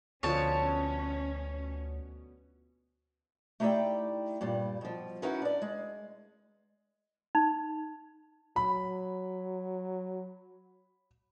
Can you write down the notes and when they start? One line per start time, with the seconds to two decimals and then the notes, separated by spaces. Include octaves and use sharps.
0.23 D2 B2 D3 F3 C#4 C#5 A5
3.60 A3 D#4 E4 G4 D5 G5
4.41 G2 A#2 G3
4.81 B2 F3
5.22 C#4 D#4 E4 F#4 B4
5.42 D4 D5
5.62 G#3
7.35 D#4
8.56 F#3 B5